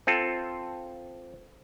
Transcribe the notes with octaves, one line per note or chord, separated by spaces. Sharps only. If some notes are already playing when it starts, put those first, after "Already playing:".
C4 F4 A4